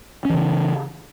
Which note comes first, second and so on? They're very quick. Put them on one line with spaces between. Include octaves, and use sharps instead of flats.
C#4 E3 C#3